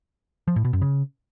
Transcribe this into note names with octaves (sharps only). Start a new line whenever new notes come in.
F3
A2
B2
F#2
C#3